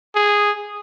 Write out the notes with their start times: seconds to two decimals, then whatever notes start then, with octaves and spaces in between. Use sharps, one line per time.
0.16 G#4